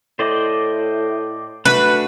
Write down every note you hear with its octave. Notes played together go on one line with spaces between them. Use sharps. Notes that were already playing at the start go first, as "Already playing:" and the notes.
A2 C5 D5 D#5
A3 D4 F#4 B4